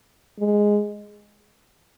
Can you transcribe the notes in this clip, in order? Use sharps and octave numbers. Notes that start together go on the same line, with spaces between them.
G#3